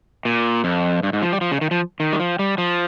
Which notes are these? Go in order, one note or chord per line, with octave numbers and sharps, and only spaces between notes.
A#2
F2
G2
G#2
F3
G3
F3
C#3
D#3
F3
D#3
G3
F3
G3
F3